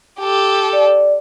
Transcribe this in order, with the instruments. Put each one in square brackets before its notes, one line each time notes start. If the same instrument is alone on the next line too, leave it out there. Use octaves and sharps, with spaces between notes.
[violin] G4 A4
[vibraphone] D5